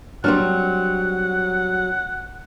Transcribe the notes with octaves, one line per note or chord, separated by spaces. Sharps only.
F#3 G3 C4 D4 F#5 F6